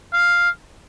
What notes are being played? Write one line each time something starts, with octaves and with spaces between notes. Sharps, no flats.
F5